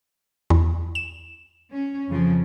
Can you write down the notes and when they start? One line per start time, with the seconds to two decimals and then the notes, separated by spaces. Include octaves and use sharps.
0.50 E2
0.95 E7
1.71 C#4
2.08 F2 C#3 F3